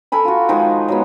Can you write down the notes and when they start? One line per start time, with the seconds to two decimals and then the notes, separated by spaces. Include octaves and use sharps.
0.12 A4 A#4 G#5 B5
0.25 F4 F#4
0.49 D#3 F3 G#3 D#4
0.88 F#3 G#3 B3